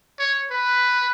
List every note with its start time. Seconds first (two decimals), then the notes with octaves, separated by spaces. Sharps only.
0.19 C#5
0.51 B4